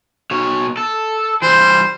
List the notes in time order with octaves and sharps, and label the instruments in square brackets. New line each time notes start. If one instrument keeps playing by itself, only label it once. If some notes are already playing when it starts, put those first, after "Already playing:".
[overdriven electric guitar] B2 C#5
A4
[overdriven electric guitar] E3 G3 [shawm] C5